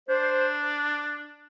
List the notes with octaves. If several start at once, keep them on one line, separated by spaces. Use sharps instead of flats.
D4 C5